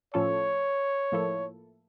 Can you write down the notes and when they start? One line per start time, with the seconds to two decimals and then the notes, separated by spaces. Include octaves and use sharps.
0.14 A2 F3 C#4 F4 A4 C#5
1.12 A2 F3 A#3 E4 A4